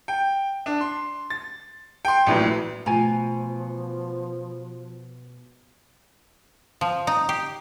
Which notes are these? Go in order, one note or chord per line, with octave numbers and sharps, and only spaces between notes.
G5
D4
C6
A6
G5 C6
A#1 A2 E3 F#3
B2 F3 A3 F4 G#5 A#5
F3
D#4
G4